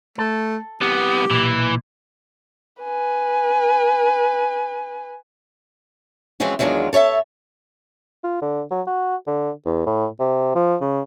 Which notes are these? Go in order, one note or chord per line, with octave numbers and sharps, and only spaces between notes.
A3 A4
C2 B3 G4
B1 A#2 E3
B4 G#5
E3 F3 G#3 C4 C#4 F#4
E2 D#3 F#3 G#3 D4 F4
A4 C#5 D#5 E5 A5
F4
D3
F#3
F#4
D3
E2
A2
C3
F3
C#3